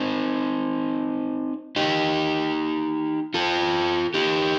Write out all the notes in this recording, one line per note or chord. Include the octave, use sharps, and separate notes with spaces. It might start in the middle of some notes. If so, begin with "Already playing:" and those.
Already playing: C4 D#4
D#4 G4
F4 A4
D#4 G4